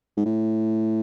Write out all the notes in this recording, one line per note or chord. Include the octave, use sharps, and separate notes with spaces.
G#2
A2